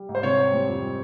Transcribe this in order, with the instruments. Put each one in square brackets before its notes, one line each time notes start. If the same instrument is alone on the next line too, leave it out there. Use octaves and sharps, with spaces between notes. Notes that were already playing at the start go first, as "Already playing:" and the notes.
Already playing: [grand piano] G3
G#2
C5
C3 C#5
C4
G3
F2